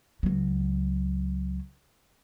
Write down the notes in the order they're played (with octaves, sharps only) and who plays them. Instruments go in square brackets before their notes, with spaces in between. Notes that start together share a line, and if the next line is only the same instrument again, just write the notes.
[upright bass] C#2 F#3